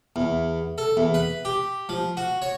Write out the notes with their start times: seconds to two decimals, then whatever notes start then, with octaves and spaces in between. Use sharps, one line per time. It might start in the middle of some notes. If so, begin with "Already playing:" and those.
0.16 E2
0.78 A4
0.97 E2
1.14 B4
1.45 G4
1.89 F3
2.17 F#4
2.42 C#5